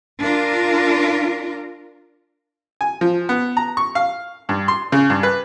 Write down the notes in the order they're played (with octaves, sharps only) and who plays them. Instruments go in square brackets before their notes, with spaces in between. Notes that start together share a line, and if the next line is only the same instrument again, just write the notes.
[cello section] D4 F4 A#4
[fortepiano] G#5
F3
B3
A#5
C#6
F5
G2
C6
C#3
G2
B4